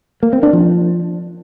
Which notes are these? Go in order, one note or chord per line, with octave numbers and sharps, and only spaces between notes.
A#3
C4
D4
F3